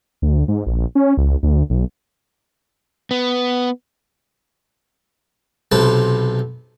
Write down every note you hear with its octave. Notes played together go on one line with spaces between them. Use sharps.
D2
G#2
A#1
C#4
C#2
D2
B1
B3
B1 C3 B4 A5